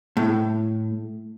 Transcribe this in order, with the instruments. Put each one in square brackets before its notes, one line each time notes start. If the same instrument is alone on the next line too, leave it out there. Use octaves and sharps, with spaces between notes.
[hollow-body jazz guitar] A2